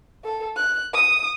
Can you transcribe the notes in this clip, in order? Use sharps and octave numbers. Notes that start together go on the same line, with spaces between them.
A4
F#6
D#6